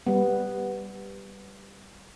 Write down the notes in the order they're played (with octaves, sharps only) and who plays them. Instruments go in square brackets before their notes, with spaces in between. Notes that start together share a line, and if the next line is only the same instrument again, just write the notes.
[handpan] G3 B3